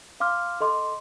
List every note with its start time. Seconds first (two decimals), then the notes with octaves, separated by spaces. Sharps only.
0.20 F5 C6 D6 F6
0.60 A4 D#5 C6 D6